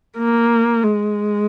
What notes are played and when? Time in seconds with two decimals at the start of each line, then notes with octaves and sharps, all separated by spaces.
0.18 A#3
0.83 G#3